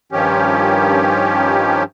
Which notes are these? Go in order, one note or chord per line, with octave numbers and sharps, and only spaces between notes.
G2 D#3 F3 C#4 G4